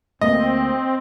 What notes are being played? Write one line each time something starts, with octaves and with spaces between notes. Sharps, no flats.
D2 A3 A#3 C4 D#5